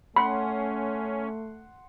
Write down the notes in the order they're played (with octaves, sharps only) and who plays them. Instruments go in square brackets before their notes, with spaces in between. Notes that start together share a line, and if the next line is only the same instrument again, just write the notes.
[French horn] A3 [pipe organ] C#4 [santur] F#5 C6 [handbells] B5